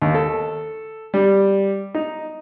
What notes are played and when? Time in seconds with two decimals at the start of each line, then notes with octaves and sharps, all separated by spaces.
0.02 D#2
0.14 A4
1.14 G3
1.95 D#4